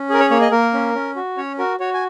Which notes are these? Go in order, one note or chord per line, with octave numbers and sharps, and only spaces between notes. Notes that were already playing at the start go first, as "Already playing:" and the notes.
Already playing: C#4
G#4 A#4
C#5
A#3 C#5
D#5
A#3 A#4
C#4
C#4
F#4
C#4 C#5
F#4 A#4
F#4 C#5
G#5